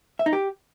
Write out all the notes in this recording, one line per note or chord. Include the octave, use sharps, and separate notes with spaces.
E5
D#4
G4